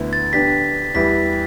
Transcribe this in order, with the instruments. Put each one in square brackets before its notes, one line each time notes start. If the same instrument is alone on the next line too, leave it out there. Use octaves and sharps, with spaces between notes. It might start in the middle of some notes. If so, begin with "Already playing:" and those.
Already playing: [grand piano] D2 D3 B3 E4
[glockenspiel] A6
[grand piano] D3 B3 D4 G4 [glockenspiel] B6
[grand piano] E2 E3 G3 E4 G4 [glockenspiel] B6